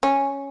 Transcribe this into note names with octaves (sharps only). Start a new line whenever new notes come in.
C#4